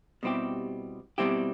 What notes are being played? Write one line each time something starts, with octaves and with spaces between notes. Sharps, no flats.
B2 G3 C4 E4 G4
B2 G3 C4 E4 G4